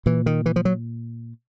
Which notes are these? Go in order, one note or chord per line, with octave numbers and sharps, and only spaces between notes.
A#2 E3
D#3
E3
F3
F#3